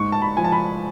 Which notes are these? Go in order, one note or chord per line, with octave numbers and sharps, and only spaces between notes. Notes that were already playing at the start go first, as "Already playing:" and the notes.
Already playing: G#2 C#6
A5
B5
F3 G#5
A5
B5